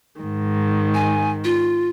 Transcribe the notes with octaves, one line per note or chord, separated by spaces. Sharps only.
G#2 D#3
G#5
F4